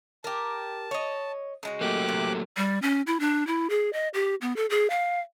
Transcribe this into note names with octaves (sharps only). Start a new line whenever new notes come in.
G4 A#4 A5
C#5 D#5
C#3 G#3 F#4
F#3 A3 A#3 G4 D6 F#6
C3
G3
C#4
E4
D4
E4
G#4
D#5
G4
B3
A4
G#4
F5